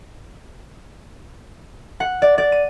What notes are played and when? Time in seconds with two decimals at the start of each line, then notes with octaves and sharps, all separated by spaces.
2.00 F#5
2.22 D5
2.38 D5
2.52 D#7